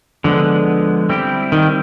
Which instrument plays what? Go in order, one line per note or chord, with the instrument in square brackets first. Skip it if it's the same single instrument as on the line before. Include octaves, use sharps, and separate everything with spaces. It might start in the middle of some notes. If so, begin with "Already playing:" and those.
[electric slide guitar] D3 [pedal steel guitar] F3 G#3 B3
[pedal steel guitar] G3 C4 E4 G4
[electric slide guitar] D#3